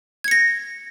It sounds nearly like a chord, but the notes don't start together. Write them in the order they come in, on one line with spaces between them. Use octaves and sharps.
G#6 C#7 A#6